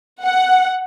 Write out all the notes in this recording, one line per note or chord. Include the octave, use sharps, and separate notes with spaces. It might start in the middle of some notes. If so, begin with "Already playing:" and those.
F#5